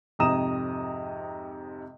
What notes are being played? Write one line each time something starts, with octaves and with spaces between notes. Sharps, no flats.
F2 G#2 C3 A#5 D#6 E7